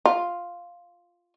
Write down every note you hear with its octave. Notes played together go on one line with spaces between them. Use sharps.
F4